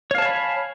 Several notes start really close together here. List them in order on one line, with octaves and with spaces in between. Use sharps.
C#5 F5 A5 G#5 B5